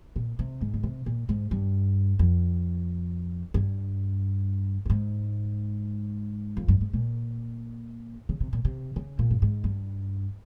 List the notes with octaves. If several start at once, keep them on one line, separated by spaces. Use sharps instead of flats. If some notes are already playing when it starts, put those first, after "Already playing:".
A#2
C3
G#2
C#3
C3
A#2
G#2
G2
F2
G2
G2
G#2
F2
G2
G#2
A#2
C#3
C3
A#2
C3
C#3
A#2
G2
G#2
G2